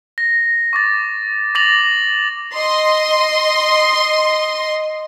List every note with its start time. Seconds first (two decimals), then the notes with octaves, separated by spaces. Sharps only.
0.18 A#6
0.73 C#6 D6 A6
1.55 D6 A6 A#6 F7 F#7
2.56 D#5 C6